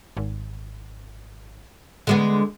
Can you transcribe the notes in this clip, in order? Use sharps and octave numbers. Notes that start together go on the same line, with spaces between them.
G#1
D3 G#3 B3